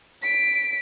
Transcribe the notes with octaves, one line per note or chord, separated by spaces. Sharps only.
B6 D7